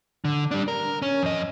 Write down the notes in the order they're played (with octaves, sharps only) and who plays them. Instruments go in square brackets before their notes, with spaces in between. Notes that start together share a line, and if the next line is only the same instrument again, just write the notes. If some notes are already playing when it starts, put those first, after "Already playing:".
[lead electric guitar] D3
G3 D4
A#4
C#4
F2 D#5